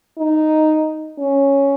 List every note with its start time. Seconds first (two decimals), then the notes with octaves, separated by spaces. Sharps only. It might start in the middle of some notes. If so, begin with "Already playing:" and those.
0.18 D#4
1.19 C#4